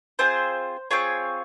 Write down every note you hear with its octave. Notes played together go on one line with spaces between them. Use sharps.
C4 F4 G#4 C5
C4 F4 G#4 C#5